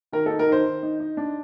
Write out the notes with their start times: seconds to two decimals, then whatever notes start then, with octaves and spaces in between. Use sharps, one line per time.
0.13 D#3 A#4
0.26 D#4 A4
0.39 A#4
0.48 D#3 C5
0.65 D#3
0.83 D#4
1.00 D#4
1.17 D4